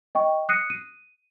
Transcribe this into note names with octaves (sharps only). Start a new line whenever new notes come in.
D#5 G5 C#6
D#6 F#6 A#6 C7 C#7 D#7
D#7